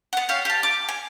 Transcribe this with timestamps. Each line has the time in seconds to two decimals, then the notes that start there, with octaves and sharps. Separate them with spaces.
0.13 B3 F#5
0.29 G4 C#5 F5
0.45 G4 A5
0.63 D6
0.89 G#5